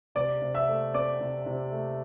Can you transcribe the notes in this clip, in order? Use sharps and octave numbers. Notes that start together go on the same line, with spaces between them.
C3 D5 D6
C3
E5 E6
A3
C4 D5 D6
C3
C3
A3